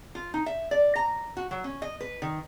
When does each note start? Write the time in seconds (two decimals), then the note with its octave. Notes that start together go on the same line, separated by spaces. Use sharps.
0.15 F4
0.34 D#4
0.46 E5
0.71 D5
0.96 A#5
1.37 F#4
1.51 F#3
1.64 C#4
1.82 D#5
2.01 B4
2.22 D#3